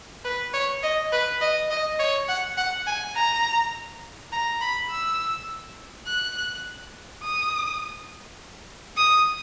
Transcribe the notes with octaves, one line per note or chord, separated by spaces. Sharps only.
B4
C#5
D#5
B4
D#5
D#5
C#5
F#5
F#5
G#5
A#5
A#5
B5
E6
F#6
D#6
D#6